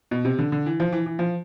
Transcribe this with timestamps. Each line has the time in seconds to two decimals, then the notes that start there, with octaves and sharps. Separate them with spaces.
0.11 B2
0.25 C3
0.39 D3
0.52 D3
0.66 E3
0.80 F3
0.92 E3
1.06 E3
1.19 F3